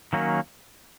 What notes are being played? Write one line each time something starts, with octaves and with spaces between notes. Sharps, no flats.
D#3 F#3 A#3 C#4